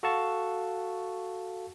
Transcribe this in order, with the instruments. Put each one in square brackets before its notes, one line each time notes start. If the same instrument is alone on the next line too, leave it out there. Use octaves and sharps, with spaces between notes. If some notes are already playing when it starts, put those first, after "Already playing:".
[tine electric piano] F#4 A4 F5 A5 C#6